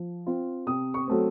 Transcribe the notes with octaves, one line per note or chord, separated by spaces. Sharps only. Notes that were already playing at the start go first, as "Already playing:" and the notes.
Already playing: F3
C4 F4
C3 D#6
C#6
F#3 A3 C4